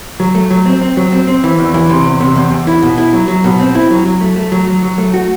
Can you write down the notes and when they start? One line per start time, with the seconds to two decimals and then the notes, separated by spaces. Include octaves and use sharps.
0.20 F#3
0.35 A3
0.51 F#3
0.66 C4
0.81 C4
0.97 F#3
1.12 C4
1.28 C4
1.44 E3
1.58 E2
1.74 E3
1.89 C3
2.05 E2
2.20 C3
2.36 E2
2.51 E2
2.67 E4
2.83 B2
2.98 E4
3.13 F#3
3.28 F#3
3.44 B2
3.60 C4
3.75 E4
3.91 F#3
4.05 F#3
4.21 A3
4.36 A3
4.52 F#3
4.67 F#3
4.83 F#3
4.98 A3
5.14 F#4